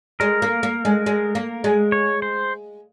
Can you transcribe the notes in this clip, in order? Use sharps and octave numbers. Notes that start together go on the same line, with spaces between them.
G#3 A#4
A#3
A#3
G#3
G#3
A#3
G#3
C#5
C5